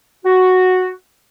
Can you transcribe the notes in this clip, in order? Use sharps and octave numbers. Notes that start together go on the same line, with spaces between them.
F#4